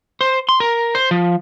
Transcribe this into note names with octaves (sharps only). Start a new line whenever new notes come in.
C5
C6
A#4
C5
F3